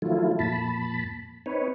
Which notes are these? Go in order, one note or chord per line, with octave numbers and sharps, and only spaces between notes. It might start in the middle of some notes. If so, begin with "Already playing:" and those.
D#3 F3 F#3 A3 E4 F4
F2 A#2 A5 B5
C4 D#4 B4 C#5